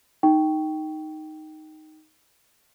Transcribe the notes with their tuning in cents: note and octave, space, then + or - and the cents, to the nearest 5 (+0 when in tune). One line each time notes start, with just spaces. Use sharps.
D#4 +0 G5 -10 C#6 +0